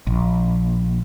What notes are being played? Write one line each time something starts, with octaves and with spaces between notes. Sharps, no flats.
A#1